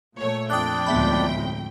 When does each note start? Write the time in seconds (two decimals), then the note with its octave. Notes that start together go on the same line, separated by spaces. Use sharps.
0.17 A#2 A3 C#5
0.50 F2 D4 D5 G5 D#6 F#6
0.87 D2 A2 G#3 B3 E5 B5